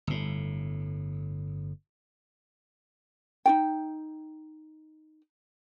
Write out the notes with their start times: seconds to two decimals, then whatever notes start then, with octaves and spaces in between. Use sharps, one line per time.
0.07 G1 A2
3.46 D#4 F4 G5